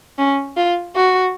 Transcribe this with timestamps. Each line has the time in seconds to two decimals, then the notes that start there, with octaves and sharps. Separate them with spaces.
0.18 C#4
0.57 F4
0.96 F#4